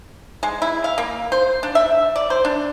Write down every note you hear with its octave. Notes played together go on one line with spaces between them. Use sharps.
G#3
E4
F5
A#3
C5
D4
E5
D5
C5
D4